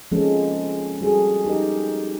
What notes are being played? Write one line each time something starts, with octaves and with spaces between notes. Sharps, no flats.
F3 G#3 A#3 C4 C#4 A4
G3 F#4 G#4 A4
D#4 G4 A#4 D#5